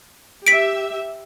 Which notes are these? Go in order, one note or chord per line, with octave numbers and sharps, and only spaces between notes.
G4 E5 B6 D7